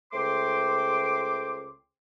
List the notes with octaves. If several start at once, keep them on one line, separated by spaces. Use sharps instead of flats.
C#2 A3 C5 G5 C6 D6